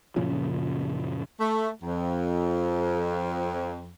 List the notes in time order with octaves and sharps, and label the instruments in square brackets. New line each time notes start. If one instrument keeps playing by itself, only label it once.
[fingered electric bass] F#1 A#2 C#3 F3
[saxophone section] A3
F2